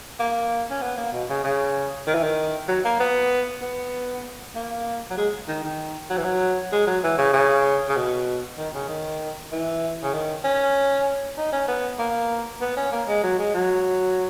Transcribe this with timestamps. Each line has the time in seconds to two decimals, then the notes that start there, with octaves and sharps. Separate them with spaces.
0.20 A#3
0.71 C#4
0.82 B3
0.98 A#3
1.13 B2
1.29 C#3
1.44 C#3
2.07 D#3
2.14 E3
2.23 D#3
2.68 F#3
2.85 A#3
3.00 B3
3.62 B3
4.55 A#3
5.10 F#3
5.17 G#3
5.48 D#3
5.64 D#3
6.10 F#3
6.17 E3
6.24 F#3
6.72 G#3
6.87 F#3
7.03 E3
7.18 C#3
7.33 C#3
7.88 C#3
7.97 B2
8.58 D#3
8.74 C#3
8.88 D#3
9.52 E3
10.03 C#3
10.13 D#3
10.44 C#4
11.37 D#4
11.53 C#4
11.68 B3
11.99 A#3
12.61 B3
12.77 C#4
12.92 A#3
13.08 G#3
13.23 F#3
13.39 G#3
13.54 F#3